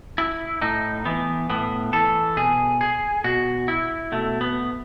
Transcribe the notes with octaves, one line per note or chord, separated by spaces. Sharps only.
E4
A2 D#4
E3 B3
A2 B3
E3 A4
B2 G#4
G#4
B2 F#4
E4
B2 A3
B3